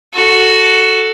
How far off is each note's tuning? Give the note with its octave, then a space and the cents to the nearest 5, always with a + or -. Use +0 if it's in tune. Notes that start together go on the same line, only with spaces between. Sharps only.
F#4 +0 A4 +0